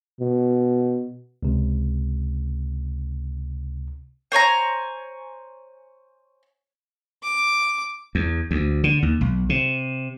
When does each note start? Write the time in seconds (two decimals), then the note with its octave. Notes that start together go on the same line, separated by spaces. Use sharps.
0.21 B2
1.43 C#2 C3
4.32 C5 C#5 G#5 A#5
7.23 D6
8.15 E2
8.51 D2
8.84 D3
9.02 D#2
9.21 B1
9.49 C3